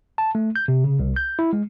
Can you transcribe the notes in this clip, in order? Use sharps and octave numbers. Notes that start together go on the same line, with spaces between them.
A5
A3
G6
C3
C#3
C2
G6
E4
G#3